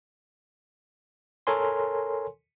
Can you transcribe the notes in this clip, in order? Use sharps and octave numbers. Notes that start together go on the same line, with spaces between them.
A4 A#4 C#5 G#5 C6